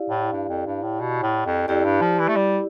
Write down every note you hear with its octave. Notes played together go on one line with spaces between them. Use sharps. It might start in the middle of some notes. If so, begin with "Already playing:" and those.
Already playing: E4 G4 D5 F5
A2
G2
F2
G2
A2
B2
A2
F2
F2 E4 G4 D5
G2
F3
E3
A3
G3